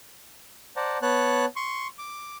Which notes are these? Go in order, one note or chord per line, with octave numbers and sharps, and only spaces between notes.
C5 D5 F#5 A5 A#5
B3 C#5 A5 F#6
C6 C#6
D6